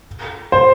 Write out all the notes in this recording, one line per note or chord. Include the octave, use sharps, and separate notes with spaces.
C5